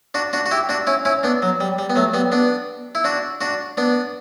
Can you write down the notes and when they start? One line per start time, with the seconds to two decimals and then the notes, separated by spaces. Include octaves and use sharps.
0.14 D4 F#4
0.33 D4 F#4
0.46 F#4
0.51 E4 G4
0.69 D4 F#4
0.87 C#4 E4
1.05 C#4 E4
1.23 B3 D4
1.42 F#3
1.61 G3
1.79 G3
1.90 B3
1.96 F#3 A3
2.14 G3 B3
2.32 B3 D4
2.95 E4
3.04 D4 F#4
3.41 D4 F#4
3.77 B3 D4